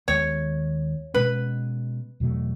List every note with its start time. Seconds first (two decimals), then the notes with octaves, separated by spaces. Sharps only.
0.08 D#2 D#3 G#3 B3 C#5
1.14 B2 G#3 C#4 B4
2.20 E2 B2 F#3 A3